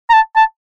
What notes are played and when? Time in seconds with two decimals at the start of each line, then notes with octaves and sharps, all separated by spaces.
0.10 A#5
0.13 A5
0.36 A5